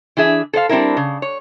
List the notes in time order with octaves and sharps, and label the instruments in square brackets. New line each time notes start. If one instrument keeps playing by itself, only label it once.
[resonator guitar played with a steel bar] E3 D4 G#4 E5
A4 C5 D5 F5
G3 C4 D4 E4 A#4
C#3
C#5